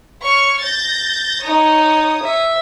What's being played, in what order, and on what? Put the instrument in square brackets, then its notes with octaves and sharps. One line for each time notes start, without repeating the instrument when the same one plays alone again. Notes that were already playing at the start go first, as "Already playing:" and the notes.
[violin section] C#5 C#6 F6
G6 A6 A#6
[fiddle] D#4 [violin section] C#5 D#6
[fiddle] E5